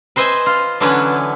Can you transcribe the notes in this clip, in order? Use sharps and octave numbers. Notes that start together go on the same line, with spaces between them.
B4 C5 D#5 E5 G#5
F4
D3 E3 F#3 C#4 D4 B4